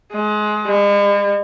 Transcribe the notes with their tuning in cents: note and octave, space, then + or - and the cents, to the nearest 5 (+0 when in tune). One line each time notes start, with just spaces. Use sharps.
G#3 +25
G#3 -45